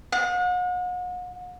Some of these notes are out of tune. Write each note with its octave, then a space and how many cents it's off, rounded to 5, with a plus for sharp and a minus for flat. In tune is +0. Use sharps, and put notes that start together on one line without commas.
F#5 -40